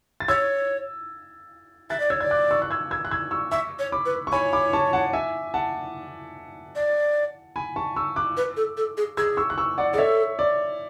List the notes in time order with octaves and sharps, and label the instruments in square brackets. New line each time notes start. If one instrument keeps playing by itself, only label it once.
[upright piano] A6
[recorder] C#5 [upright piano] E6 G#6
[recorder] E5 [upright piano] F#6 A6
[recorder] D5
[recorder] C#5 [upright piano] E6 G#6
[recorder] D5 [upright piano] G#6
[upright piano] D6 F#6
C#6 E6
F#6
E6 G#6
E6 G#6
F#6
E6 G#6
C#6 E6
[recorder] E5 [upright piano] C#6 E6
[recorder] C#5
[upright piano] B5 D6
[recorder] B4
[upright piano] C#6
[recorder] C#5 [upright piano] G#5 B5
[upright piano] B5 D6
A5 C#6
F#5 A5
E5 G#5
F#5 A5
[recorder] D5
[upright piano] G#5 B5
A5 C#6
C#6 E6
D6 F#6
[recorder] B4
A4
A4
G#4
[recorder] G#4 [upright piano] E6 G#6
[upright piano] C#6 E6
F#6
C#6 E6
D5 F#5
[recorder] G#4 [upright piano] D5
[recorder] A4 [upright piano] C#5 E5
[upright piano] D5